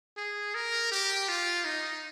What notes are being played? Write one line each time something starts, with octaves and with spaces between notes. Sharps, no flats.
G#4
A#4
G4
F4
D#4